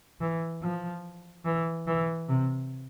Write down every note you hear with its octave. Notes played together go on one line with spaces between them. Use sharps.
E3
F3
E3
E3
C3